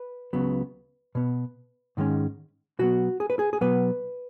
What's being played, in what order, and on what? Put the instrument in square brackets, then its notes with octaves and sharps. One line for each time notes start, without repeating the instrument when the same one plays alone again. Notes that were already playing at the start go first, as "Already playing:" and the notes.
Already playing: [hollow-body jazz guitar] B4
C#2 C#3 F#3 B3
B2 B3
G#2 D#3 G#3 C#4
B2 F#3 B3 F#4
G#4
B4
G#4
G#4
B2 F#3 B3 B4